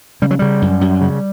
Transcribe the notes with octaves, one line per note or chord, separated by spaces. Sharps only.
C#3 G3
F#3
C#3 G3
F#2
F#2
C#3